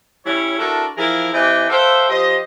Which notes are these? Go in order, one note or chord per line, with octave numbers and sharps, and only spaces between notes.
G3 C#4 E4 C#5
D4 E4 F#4 A4 A#4
E3 F3 E4 G#4 A#4
E3 C4 G4 D#5 G5 G#5
A4 B4 C5 E5 F5 G5
F3 G4 C5 D#5